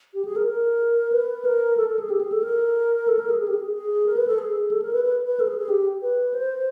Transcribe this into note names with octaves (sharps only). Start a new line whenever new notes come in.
G4
G#4
A#4
A#4
B4
A#4
A4
A4
G#4
G4
G#4
A4
A#4
A4
A#4
G#4
G#4
G4
G#4
G#4
A#4
B4
A4
G#4
A4
A#4
B4
B4
B4
A4
G#4
G#4
G4
B4
C5